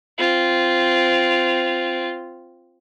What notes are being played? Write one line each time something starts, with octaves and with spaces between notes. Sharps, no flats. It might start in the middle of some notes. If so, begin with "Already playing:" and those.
C4 F4